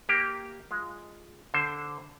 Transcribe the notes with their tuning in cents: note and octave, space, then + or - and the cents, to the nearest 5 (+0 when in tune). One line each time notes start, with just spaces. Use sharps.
A#3 +0 G4 +0
G#3 +0 F4 +0
D3 -5 C5 +5